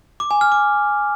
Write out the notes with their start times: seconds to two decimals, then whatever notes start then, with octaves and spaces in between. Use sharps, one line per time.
0.20 D6
0.31 G#5
0.41 F6
0.52 D6